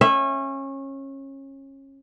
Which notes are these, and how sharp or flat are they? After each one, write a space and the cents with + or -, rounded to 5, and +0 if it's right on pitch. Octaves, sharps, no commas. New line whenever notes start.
C#4 -25 E5 +0